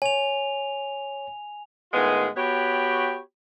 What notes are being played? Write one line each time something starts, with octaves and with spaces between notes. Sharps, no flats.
C#5 G#5 F7
A2 D#3 G#3 B3 F4 G#4
B3 F#4 G4 C#5 G5 B5